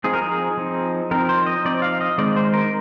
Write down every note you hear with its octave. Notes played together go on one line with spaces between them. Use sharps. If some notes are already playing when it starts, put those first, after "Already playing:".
F3 C4 D#4 G#4
A#4
G#4
F3 C4 D#4
F3 C4 D#4 A#4
C5
D#5
F3 C4 D#4 D5
F5
D#5
D#3 G#3 C4 D#4 D5
C5
A#4